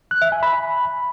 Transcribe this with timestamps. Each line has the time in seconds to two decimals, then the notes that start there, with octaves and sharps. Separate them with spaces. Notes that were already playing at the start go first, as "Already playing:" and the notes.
0.11 F#6
0.22 E5
0.32 G#5
0.43 B5